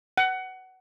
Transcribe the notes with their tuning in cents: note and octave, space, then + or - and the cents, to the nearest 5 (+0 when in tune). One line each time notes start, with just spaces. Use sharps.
F#5 +20